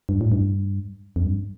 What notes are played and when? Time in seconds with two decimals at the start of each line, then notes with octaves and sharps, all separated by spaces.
0.09 G2
0.21 A2
0.32 G2
1.16 F2
1.24 G2